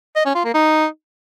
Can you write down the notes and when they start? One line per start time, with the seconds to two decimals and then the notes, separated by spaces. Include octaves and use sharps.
0.16 D#5
0.25 C#4
0.35 F4
0.44 A#3
0.54 D#4